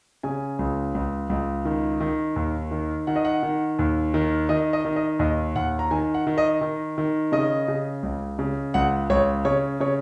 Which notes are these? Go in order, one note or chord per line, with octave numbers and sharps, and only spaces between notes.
C#3 G#5
C#2
C#2
C#2
D#3
D#3
D#2
D#3
D#3 F#5
D#5
F#5
D#3
D#2
D#3
D#3 D#5
D#5
D#3
D#5
D#2 D#5
D#2 F#5
A#5
D#3 G#5
F#5
D#3
D#5
D#3
D#3
C#3 D#5
C#3
C#2
C#3
C#2 F#5
C#2 C#5
C#3 C#5
C#3 C#5